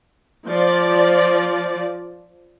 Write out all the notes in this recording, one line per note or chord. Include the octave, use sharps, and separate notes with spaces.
F3 D5